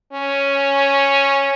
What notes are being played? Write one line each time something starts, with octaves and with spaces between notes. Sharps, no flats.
C#4